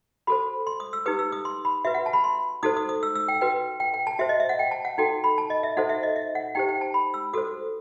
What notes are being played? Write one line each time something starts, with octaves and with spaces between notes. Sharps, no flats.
F#4 A4 C5 B5
C6
D#6
E6
D#4 G4 B4 D#6
E6
D#6
C6
B5
F#4 B4 E5
F#5
A5
B5
C6
D#4 F#4 A4 C5 D#6
D#6
D#6
E6
E6
G5
F#4 B4 G5
G5
G5
A5
F#4 C5 E5
D#5
E5
F#5
G5
A5
F#5
D#4 F#4 A4 G5
B5
A5
D#5
E5
D#4 F#4 A4 C5 F#5
E5
D#5
E5
F#5
D#4 G4 C5 G5
G5
A5
B5
E6
F#4 A4 C5 D#6